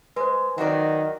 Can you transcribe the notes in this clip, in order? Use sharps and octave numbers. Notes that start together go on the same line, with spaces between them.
G#3 B4 C5
D#3 F#3 F#4 D5